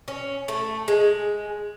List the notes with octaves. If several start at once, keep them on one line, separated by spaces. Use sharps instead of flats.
C#4
A3
G#3